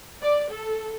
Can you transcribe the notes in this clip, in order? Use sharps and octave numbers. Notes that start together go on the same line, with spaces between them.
D5
A4